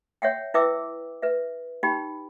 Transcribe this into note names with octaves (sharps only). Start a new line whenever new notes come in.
C#5 E5 F#5 G5
E4 B4 E5 G5 D6 E6
B4 E5
D#4 G4 G5 B5